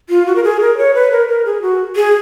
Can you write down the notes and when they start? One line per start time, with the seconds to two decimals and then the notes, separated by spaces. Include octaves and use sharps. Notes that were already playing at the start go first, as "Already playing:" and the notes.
0.09 F4
0.26 F#4
0.36 A#4
0.44 G#4
0.61 A#4
0.77 C#5
0.94 B4
1.11 A#4
1.28 A#4
1.45 G#4
1.62 F#4
1.96 G#4